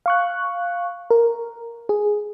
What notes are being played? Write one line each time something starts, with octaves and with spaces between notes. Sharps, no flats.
F5 C#6 F#6
A#4
G#4